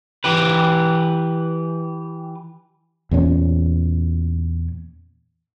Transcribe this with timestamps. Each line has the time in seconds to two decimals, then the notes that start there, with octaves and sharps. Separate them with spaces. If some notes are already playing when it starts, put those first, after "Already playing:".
0.24 E3 G4 B4
3.11 E2 A#2 C#4